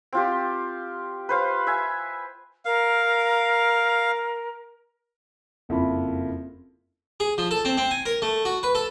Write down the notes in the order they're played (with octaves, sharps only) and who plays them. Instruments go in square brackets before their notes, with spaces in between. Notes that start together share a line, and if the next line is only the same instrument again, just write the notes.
[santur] C4 F4 G4
B4 C5 F5
E5 G#5
[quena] A#4 [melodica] F5
[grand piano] F#1 F2 E4 F4 B5
[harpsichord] G#4
F3
A4
C4
C4
G#5
A#4
A3
F#4
B4
A4